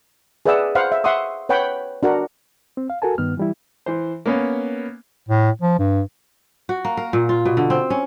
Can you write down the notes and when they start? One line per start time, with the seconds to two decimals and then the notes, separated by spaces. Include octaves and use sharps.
0.46 G#4 B4 D5 E5 F#5 E6
0.75 C5 F5 F#5 B5
0.92 E5
1.04 E5 F#5 C6 C#6 D#6
1.49 B4 C#5 F#5 G5 B5
2.03 D4 F#4 A#4 F#5
2.77 C4
2.90 F5
3.02 F#4 A4 A#4 G#5 A5
3.18 G2 D#3 B3 F6
3.37 E3 G3 E4
3.86 E3 C5
4.26 A#3 B3 C#4
5.29 A2
5.62 F3
5.79 G2
6.69 F#4
6.85 A#3
6.97 A#4
7.13 A#2
7.29 F4
7.45 B2
7.57 D3
7.70 C4
7.90 C#4